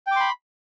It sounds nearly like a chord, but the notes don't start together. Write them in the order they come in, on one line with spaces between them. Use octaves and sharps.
G5 D6 C6 B5